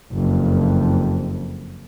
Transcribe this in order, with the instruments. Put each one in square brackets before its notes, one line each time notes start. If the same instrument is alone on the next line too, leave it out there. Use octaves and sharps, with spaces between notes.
[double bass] F#1 F2